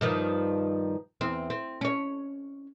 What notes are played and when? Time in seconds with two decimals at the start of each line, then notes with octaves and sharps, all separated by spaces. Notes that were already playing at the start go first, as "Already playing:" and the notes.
0.01 G2 D#3 F3
1.21 E2 C4
1.50 C4
1.81 C#4 C#5